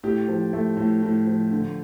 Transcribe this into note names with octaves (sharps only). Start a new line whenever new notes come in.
A2 G4
F3
A3
A2
A2
F3
D3